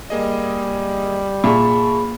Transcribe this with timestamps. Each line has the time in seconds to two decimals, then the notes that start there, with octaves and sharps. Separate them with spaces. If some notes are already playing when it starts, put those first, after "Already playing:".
0.10 G3 A#3 G#4 D#5
1.44 A#2 G#4 E5 A5 B5 C#6